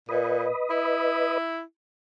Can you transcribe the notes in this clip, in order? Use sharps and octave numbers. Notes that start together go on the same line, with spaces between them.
A#2 B4 D#5
E4